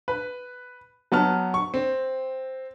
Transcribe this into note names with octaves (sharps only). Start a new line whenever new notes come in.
B4
F#3 B3 A5 F6
C#6
C4